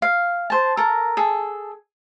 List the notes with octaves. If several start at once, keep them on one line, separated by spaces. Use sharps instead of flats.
F5
C5 A5
A4 A#4
G#4 A4